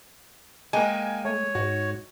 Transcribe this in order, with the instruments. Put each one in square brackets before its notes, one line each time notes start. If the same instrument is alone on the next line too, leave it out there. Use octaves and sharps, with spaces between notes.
[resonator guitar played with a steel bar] G#3 [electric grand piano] A#3 G5 G#5
[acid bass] A3 [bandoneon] C#5
[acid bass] G#2 [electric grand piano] F#4